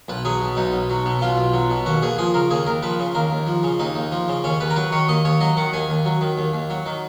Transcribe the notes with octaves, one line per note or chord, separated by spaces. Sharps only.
B1 B4
F#3 G#4
B2
B1 D#4
B1
F#3
B2
B1 F4
B1
F#3
B2
D#2 F#4
D#2 G#4
F3 G#4
C#3 A#4
D#2 G#4
D#2 A#4
F3 B4
C#3
D#2 A#4
D#2
F3
C#3
D#2 D#4
D#2
F3
C#3
D#2 C#4
D#2 B4
A#4
F#3 B4
D#3 C#5
D#2 D#5
D#2 C#5
F#3 D#5
D#3 F#5
D#2 G#5
D#2
F#3
D#3
D#2
D#2
F#3
D#3